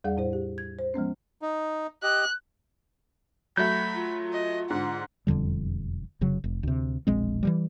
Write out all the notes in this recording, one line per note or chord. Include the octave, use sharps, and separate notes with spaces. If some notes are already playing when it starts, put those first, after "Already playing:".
E2 G3 G#4 D5 F5 F#5
A2 E4 C5
G4
G#6
C5
F3 G#3 B3 C#4
D#4
G4 D#5 F#6
F#3 A3 B5 G6
F4
D#5
G#2 D3 F#5
E1 F2 D3 G3
F1 C#3 F#3
F1
D2 C3
E1 A#1 G#3 C4
E3 F3 G3